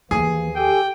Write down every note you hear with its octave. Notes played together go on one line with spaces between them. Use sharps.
D#2 E3 F3 A#3 G#4
G4 A4 G5 G#5